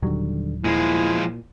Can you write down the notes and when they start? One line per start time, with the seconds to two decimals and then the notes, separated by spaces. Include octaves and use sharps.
0.02 D#1 D3 D#3 F#3 G3
0.64 A#2 F3 G#3 E4